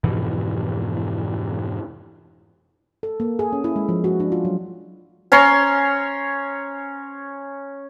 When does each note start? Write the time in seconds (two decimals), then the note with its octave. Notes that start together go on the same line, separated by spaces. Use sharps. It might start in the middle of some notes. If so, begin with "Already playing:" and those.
0.04 F2 G#2 B2 E3
3.03 A4
3.20 A#3
3.39 G#4
3.53 C#4
3.64 E4
3.76 G#3
3.89 F3
4.04 F#4
4.20 D4
4.32 F4
4.45 F#3
5.32 C#4 C#5 A#5 C6